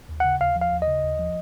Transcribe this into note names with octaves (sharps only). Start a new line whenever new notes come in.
D#2
C#3 F#5
D#2 F5
F3
F5
D#2
D#5
C#3
D#2
F3